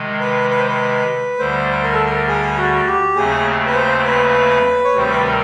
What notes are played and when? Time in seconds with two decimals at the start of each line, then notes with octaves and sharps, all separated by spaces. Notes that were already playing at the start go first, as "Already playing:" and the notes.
Already playing: C3 D#3 G#3
0.20 B4
0.51 B4
0.60 C5
0.68 B4
1.39 D2 D3 G3 C5
1.83 A#4
1.94 A4
2.06 A#4
2.27 G#4
2.57 F#4
2.87 G4
3.16 D#2 C#3 F#3 A3 C4 G#4
3.66 B4
3.75 C5
4.05 B4
4.84 C#5
4.94 D2 C3 D#3 G3 C4 C5
5.10 B4
5.24 A#4